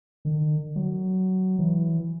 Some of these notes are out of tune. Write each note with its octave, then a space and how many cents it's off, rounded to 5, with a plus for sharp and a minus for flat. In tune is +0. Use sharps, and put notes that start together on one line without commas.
D#3 -40
F#3 +15
E3 +5